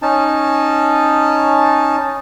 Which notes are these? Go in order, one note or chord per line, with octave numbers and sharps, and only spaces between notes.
C#4 D#4 A5